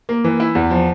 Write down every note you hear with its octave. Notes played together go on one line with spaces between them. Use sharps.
A#3
E3
E4
E2
F3